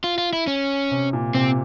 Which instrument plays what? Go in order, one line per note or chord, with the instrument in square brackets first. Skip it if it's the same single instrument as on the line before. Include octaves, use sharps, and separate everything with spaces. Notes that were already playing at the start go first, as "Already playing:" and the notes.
[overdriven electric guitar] F4
F4
E4
C#4
[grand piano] C3
A#2
[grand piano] C3 [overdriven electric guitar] C4